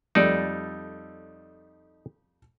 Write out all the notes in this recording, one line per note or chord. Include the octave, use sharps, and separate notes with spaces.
F2 G3 A3 D#4 A4 D5